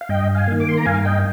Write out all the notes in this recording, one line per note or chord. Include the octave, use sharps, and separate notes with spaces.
F5
G2 D#5 G5
F5 G#5
D#3 A#3
D6
C6
A#5
G2 F5 G#5
D#5 G5